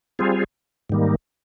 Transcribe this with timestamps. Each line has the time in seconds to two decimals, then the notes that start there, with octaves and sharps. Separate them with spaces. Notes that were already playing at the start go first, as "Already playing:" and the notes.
0.19 G3 C4 F4 G#4
0.89 G#2 D#3 G3 A#3